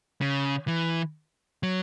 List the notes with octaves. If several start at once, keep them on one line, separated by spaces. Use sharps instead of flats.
C#3
E3
F#3